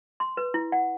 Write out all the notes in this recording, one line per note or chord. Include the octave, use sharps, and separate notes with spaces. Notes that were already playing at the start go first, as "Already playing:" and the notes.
C6
B4
E4
F#5